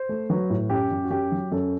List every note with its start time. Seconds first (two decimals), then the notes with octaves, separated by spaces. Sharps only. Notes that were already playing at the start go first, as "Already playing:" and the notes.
Already playing: C5
0.09 A3
0.30 F#3 B4
0.50 A2
0.70 F#2 G4
0.91 F#2
1.04 F#4
1.10 F#2 G4
1.32 F#3
1.52 F#2 A4